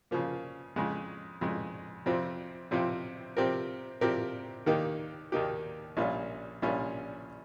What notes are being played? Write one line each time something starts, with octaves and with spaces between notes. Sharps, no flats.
C#3 F3 A#3
F2 C#3 G#3
F2 C#3 G#3
F2 C3 F3 C4 F4
F2 C3 F3 C4 F4
C3 F3 C4 G4 A#4
C3 F3 C4 G4 A#4
D#2 D#3 A#3 D#4 G4
D#2 D#3 A#3 D#4 G4
A#1 A#2 G3 C#4 F4
A#1 A#2 G3 C#4 F4